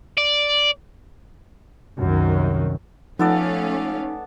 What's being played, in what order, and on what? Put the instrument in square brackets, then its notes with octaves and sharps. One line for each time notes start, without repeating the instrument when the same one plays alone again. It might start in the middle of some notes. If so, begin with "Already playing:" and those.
[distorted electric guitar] D5
[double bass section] C2 F#2 D#3
[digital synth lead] F3 [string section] A3 C#4 F5 [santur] B3 A4 D5 [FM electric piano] D#4